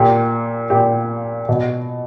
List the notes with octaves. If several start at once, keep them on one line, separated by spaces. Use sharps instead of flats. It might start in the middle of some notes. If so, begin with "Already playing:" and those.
Already playing: A#2 G4
A#2 G4
B2